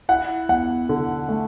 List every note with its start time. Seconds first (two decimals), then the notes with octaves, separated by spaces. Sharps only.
0.09 E4 F#5
0.49 E2 F#5
0.89 D3
1.29 A3